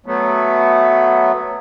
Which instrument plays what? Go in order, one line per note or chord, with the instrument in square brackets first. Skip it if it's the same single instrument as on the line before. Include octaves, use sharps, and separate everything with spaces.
[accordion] F#3 A3 B3